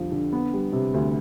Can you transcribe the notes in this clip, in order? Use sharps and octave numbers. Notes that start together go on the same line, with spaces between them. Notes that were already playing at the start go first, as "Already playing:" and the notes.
Already playing: F2 D3 F3 G3
D3
B3
G3
C3
D2